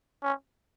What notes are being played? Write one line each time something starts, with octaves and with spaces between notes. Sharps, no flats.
C#4